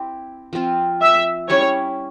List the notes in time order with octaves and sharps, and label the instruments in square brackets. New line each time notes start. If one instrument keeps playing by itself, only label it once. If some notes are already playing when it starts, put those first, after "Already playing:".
Already playing: [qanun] C4 E4 G4
F3 C4 F4
[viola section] E5
[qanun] G3 C#4 E4 [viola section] C#5